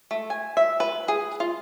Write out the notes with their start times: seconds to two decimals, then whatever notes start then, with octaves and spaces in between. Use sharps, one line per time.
0.11 A3
0.30 G#5
0.57 E5
0.80 B4
1.08 G#4
1.40 F4